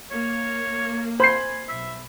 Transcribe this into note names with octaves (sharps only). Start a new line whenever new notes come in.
A#3 C#5
C5 G#5 B5 C7
B1 E5